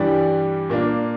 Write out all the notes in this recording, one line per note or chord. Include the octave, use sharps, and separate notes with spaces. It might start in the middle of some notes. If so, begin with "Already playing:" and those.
Already playing: G2 E3 G3 D5
A#2 A#3 D4